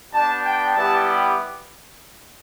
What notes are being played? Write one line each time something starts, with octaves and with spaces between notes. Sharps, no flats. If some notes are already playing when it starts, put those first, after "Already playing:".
B3 D4 G4 A5
G5
G3 B3 E4 G4 A5